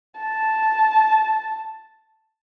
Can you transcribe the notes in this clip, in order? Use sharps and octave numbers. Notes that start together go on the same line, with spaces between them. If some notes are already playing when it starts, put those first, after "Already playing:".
A5